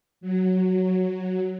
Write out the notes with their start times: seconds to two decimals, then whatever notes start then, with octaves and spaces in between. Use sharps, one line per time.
0.21 F#3